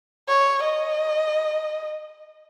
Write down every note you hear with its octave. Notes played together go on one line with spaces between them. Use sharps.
C#5
D#5